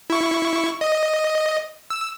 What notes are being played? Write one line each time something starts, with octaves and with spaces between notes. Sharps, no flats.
E4 C#6
D#5
E6